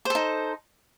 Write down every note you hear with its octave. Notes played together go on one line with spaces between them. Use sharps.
D#4 A4 C5